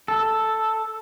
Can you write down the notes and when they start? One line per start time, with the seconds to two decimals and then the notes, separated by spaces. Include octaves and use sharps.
0.08 A4